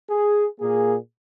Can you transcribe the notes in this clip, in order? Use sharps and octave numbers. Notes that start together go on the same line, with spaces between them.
G#4
A#2 A#3 G#4